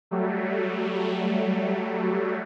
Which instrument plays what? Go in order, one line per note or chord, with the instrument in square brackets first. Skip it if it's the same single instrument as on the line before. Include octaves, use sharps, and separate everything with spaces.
[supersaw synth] F#3 G3 A3